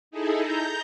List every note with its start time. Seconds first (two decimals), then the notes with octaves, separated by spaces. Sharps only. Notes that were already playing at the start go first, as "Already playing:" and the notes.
0.11 D#4 E4 G#4 A4
0.40 A#5 G6